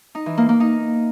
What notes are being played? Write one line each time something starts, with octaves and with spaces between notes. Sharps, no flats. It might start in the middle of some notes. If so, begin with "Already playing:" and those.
D#4
E3
A#3
A#3
D#4